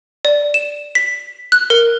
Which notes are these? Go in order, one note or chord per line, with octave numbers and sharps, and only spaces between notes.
D5
E7
B6
F#6
A#4